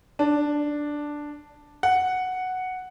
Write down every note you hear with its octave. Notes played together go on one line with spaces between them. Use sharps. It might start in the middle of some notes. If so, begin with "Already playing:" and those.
D4
F#5